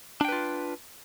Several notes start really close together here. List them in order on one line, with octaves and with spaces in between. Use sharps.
D4 G5 B4 F4